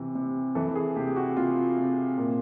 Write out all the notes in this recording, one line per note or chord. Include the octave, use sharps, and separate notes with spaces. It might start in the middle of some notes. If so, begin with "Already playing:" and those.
Already playing: C3 E3
C3
E3 A4
G#4
C3 G4
F#4
C3 F4
C3
A#2